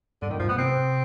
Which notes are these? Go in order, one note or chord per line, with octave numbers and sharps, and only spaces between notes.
G2 D3
F#2 D#3
G2 F3
A2 B3
C3 C4